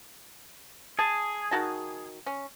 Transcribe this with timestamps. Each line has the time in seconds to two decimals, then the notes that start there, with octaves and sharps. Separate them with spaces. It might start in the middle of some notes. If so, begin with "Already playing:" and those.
0.99 G#4 A5
1.51 D#3 F#4 A5
2.26 C#4